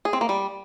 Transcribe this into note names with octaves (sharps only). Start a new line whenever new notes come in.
G#4
C4
A#3
G3